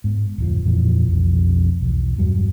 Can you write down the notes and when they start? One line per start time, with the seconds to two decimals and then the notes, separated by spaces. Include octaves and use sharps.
0.04 G#2 B3
0.38 D1 F2 F3
0.65 F2 A#2 E3 F3
1.07 B1 F2
1.81 B1 E2
2.17 E2 G2 F#3